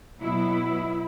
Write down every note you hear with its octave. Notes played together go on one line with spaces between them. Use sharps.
B2 F#3 B3 E4